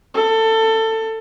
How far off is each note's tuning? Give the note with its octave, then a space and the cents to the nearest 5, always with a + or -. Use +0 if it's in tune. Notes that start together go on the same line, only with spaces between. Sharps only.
A4 +20